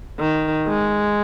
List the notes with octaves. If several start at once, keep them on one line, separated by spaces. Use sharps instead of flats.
D#3
G#3